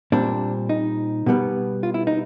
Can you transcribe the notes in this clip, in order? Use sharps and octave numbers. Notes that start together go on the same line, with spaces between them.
A#2 G3 C4 D4
D#4
B2 G3 B3
F4
E4
D#4